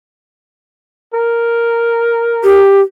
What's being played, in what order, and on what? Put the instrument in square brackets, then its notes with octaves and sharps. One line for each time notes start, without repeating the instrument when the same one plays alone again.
[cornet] A#4
[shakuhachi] G4